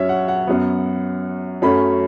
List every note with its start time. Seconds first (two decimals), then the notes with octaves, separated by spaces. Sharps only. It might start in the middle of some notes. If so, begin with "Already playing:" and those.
Already playing: F#2 F#3 C#4 C#5 E5
0.09 F#5
0.28 F#5
0.47 F#2 F#3 B3
1.62 F#2 F#3 A3 C#4 B5